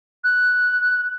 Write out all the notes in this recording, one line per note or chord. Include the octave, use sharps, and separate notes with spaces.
F#6